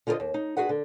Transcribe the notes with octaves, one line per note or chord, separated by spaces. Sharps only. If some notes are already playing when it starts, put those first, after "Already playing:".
D3 F4 F#4 A#4 C5 D#5
D#2
D#4
D4 D#4 F#4 G#4 B4 F#5
D3